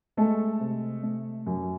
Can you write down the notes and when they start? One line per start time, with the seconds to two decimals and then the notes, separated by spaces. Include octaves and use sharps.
0.17 G#3 A3 A4
0.60 C3
1.03 A3
1.47 F#2